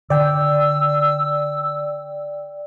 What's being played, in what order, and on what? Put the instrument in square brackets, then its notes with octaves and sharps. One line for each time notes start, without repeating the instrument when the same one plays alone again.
[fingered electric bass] D3 [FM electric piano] D5 G5 [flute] E6